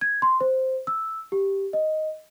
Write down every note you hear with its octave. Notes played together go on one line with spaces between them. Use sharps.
G#6
C6
C5
E6
G4
D#5